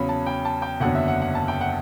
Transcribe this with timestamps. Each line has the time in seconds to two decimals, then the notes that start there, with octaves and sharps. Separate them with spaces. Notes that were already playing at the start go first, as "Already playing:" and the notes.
Already playing: E2 C#3 F#3 B5
0.09 A5
0.26 G5
0.45 A5
0.62 G5
0.80 F#1 E2 D3 F#3 F#5
0.95 E5
1.08 F#5
1.22 F#5
1.35 A5
1.48 G5
1.61 F#5